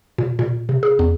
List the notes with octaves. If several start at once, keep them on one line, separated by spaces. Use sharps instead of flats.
A#2
A#2
C3
G#4
E2